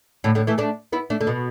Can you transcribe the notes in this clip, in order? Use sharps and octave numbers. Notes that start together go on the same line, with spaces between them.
A2 D3
A2 D3
E3 A3
A3 D4
B3 E4
A3 D4
D3
B2